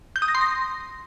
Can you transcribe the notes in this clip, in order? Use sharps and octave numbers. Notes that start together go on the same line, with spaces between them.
G6
D#6
A#6
C6
A#6